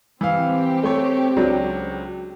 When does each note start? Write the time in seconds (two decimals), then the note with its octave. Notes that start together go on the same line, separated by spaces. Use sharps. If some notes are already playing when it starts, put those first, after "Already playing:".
0.21 E3 C4 G4 F5
0.83 A3 C#5
1.36 C#2 F#3 D4